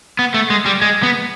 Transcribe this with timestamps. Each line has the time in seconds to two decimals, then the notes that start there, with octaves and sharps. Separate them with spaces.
0.19 B3
0.34 A3
0.50 G#3
0.66 G3
0.82 G#3
1.03 B3